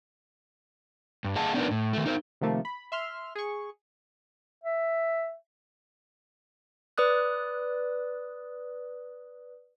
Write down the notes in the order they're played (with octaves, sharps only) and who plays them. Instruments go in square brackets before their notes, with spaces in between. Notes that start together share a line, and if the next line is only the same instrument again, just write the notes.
[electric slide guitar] G2
G#4 D#5 F5 F#5 A5
B3 D4 D#4 F#4 A#4 B4
A2
D#3 A3
D#4 A#4 C5
[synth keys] C3 D#3 F3 A3 A#3
B5
E5 C6 F6
G#4 C#6
[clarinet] E5
[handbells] B4 D5 D#6 F#6